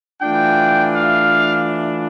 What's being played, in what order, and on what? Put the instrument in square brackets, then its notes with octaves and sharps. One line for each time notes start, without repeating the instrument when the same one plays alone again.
[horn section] E3 A3 D4 F4 G5
F5